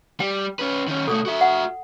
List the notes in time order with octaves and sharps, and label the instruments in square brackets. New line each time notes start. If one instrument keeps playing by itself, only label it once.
[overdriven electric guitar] G3 [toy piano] G5
[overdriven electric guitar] C#4 B4
D#3 C#4
[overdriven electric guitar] B2 A3 [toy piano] A4 D#6
[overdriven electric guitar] F#4 E5
[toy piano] F#5